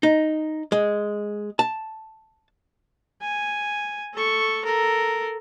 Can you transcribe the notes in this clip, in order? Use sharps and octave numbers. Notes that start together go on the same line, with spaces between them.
D#4
G#3
A5
G#5
A4 C#6
A4 A#4